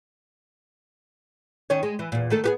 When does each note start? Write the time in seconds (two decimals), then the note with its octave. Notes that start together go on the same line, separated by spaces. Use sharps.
1.70 D#3 C#4 C#5
1.83 G#3
1.99 E3
2.12 E2 A#2
2.30 D#3 A3 A4
2.44 B3 G4 G#4